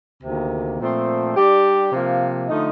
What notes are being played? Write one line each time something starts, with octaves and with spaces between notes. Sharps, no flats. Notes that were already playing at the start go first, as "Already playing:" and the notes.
D2 C3 D#3 A#3
A#2 F3 A3 C4
G3 D4 G4
C3 F3 A#3
D3 F3 A3 D#4